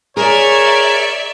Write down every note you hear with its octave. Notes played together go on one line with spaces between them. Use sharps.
G#4 A#4 C#5 D5 E5